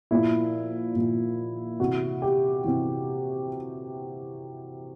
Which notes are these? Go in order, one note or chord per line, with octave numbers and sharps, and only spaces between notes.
A#2 F3 E4
A#2 F3
C3 E3 F#4
G4
C3 E3